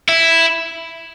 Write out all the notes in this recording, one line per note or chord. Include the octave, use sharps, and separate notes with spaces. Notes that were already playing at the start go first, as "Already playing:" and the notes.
E4